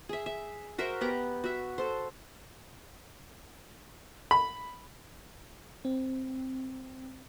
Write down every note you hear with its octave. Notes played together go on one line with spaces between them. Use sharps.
G#4 E5
E5
F#4 A#4 C5 E5
B3 G4 A#5
F#4 E5
A4 C5
B5
C4